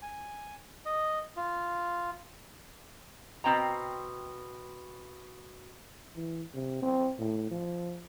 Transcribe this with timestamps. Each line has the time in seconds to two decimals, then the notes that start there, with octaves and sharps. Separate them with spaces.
0.02 G#5
0.86 D#5
1.37 F4
3.44 B2 C4 G5 A#5
6.15 E3
6.53 C3
6.82 C4
7.19 A2
7.50 F3